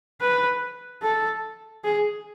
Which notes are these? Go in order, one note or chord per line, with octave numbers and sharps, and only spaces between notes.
B4
A4
G#4